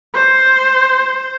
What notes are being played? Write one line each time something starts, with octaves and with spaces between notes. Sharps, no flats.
C5